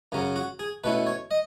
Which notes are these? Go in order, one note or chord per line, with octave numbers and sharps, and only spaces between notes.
F#2 C#3 F#3 C#4
F#4
G#4
B2 A3 C#4 E4 B4
C#5
D#5